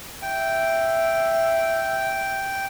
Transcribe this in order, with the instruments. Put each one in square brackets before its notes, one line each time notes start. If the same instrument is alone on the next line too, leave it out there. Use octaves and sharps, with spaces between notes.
[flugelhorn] E5 [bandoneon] G5